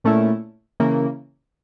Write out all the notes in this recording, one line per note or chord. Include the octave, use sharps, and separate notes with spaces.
A#2 A3 C#4 E4
C#3 E3 A#3